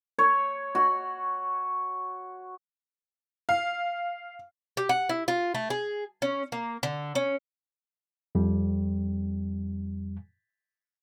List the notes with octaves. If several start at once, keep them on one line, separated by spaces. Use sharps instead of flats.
C#5
F#4
F5
G4
F#5
E4
F4
A3
G#4
C#4
A#3
D3
C#4
F2 G3